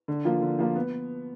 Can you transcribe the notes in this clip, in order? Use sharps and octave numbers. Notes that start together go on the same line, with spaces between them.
D3
F3 A#3 F4
D3
F3 A#3 F4
B3